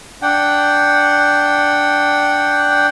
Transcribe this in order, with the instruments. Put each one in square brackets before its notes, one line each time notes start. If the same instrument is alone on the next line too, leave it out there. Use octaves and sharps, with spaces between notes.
[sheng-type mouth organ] D4 F#5 G5